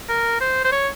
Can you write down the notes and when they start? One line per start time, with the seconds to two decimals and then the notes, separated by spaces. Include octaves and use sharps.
0.09 A#4
0.41 C5
0.64 C5
0.72 C#5